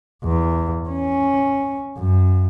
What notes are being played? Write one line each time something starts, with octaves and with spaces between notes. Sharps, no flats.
E2
C#4
F#2